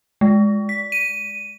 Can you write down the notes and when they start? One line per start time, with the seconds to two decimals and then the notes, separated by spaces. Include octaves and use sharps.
0.21 G#3
0.69 B6
0.92 D#7